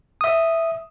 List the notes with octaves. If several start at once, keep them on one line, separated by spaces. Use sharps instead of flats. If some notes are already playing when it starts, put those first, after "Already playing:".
E5 D#6